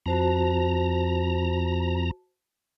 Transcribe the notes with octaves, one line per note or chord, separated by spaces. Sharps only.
F2 F#4 C5 A5 A#5